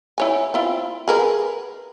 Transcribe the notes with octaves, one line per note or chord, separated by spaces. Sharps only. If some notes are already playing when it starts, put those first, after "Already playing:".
E4 C#5 G#5
C4 E4 F4
G#4 A#4 B4